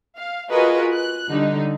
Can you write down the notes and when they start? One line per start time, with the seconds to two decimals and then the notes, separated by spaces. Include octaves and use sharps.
0.17 F5
0.51 F4 F#4 G#4 A#4 B4 D#5
0.94 F#6
1.30 D3 G3 D#4